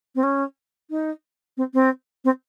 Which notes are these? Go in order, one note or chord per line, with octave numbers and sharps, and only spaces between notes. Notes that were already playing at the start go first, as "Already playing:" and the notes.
C4
C#4
D#4
C4
C4
C4